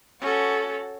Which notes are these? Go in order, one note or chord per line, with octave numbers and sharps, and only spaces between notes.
C#4 F#4 A4